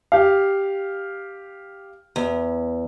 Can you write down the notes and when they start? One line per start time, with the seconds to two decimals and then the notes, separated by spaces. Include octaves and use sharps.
0.12 G4 F5
2.16 E2